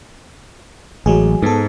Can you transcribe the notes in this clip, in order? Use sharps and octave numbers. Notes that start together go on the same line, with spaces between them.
A1 F#3 G#3 G#4
G#2 B3 A4